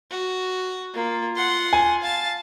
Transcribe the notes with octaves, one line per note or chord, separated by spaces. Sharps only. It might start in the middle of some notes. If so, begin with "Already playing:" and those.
F#4
A#3 F4
F#5 C6
G#5
F5 A5